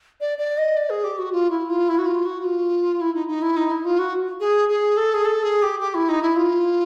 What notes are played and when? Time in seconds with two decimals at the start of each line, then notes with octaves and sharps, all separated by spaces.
0.21 D5
0.38 D5
0.58 D#5
0.77 D5
0.90 G#4
1.04 G4
1.19 F#4
1.32 F4
1.50 E4
1.70 F4
1.89 E4
1.98 F#4
2.06 F4
2.25 F#4
2.44 F4
3.01 E4
3.14 D#4
3.28 D#4
3.42 E4
3.57 D#4
3.71 E4
3.85 F4
3.99 F#4
4.40 G#4
4.69 G#4
4.97 A4
5.14 G#4
5.25 A4
5.43 G#4
5.62 G4
5.80 G4
5.94 E4
6.09 D#4
6.22 E4
6.36 F4